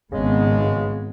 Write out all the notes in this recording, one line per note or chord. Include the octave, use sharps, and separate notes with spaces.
G#1 C#3 G#3 B3